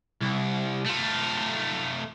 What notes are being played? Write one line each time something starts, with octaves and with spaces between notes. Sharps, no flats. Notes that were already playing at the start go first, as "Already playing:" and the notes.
C2
A3 F4